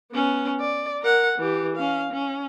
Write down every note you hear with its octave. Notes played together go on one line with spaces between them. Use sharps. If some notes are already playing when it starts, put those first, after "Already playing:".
B3 C#4
D5
A#4 F#5
E3 G4
C#4 F5
C#4